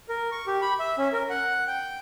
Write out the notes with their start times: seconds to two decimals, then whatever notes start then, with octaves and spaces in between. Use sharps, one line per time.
0.09 A#4
0.32 C#6
0.47 G4
0.62 B5
0.80 E5
0.98 C#4
1.13 A#4
1.30 F#5
1.67 G5